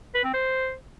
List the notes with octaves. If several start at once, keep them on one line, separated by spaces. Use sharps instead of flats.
B4
C4
C5